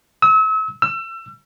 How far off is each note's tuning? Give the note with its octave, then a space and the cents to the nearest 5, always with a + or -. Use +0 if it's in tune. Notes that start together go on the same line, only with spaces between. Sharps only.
E6 -40
E6 +30